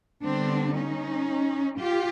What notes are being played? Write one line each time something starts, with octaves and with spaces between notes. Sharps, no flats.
D3 G3 B3 C4 D4
C#4 D#4
F4 G4